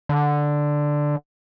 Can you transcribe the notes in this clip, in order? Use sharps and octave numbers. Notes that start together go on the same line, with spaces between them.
D3